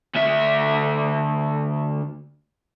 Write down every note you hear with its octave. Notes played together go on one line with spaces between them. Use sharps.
D2 E5